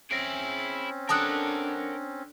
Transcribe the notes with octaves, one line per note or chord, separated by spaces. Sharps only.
C4 C#4 E4 G#4 A#6 D7
D4 A4 A#4 F#5 G5 A5 D#6 F#6